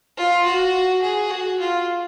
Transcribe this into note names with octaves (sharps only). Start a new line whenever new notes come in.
F4
F#4
G#4
F#4
F4